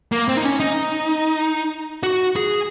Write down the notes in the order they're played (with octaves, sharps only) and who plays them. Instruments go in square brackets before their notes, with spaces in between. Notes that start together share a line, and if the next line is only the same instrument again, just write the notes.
[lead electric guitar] A#3
C4
D#4
C#4
D#4
F#4
G#4